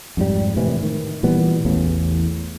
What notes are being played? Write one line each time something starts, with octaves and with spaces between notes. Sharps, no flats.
F2 G#2 G3
A2 C3 D#3 E3
D#3
A#2 E3 G3 B3
A1 E2 A2 C#3